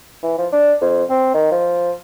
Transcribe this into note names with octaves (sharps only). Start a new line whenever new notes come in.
E3
F3
D4
F2
C4
D#3
F3